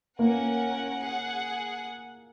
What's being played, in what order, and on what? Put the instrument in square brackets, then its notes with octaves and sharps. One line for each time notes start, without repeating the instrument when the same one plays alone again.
[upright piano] A#3 [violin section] C#4 A#4 F#5
[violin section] G#4 F#5